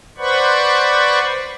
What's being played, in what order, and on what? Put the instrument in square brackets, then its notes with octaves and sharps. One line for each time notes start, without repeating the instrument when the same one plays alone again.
[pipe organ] B4 C5 D5 F#5 B5 C#6